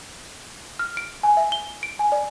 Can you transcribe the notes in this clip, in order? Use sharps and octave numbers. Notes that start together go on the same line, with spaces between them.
F6
D7
G#5
E5
G7
D7
G#5
D5